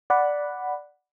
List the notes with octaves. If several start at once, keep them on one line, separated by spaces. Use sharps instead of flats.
D5 F#5 B5